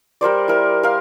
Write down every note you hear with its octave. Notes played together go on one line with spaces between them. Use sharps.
G3 A#4 C5 D5
E4 A#4
A#4 F5